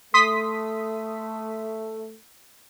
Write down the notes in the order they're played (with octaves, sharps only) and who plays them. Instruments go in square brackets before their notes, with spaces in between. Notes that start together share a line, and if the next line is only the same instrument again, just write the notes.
[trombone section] A3 [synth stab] C6 D#6 B6